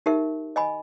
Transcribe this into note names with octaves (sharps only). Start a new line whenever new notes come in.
D#4 G4 A#4 E5
D#5 G#5 B5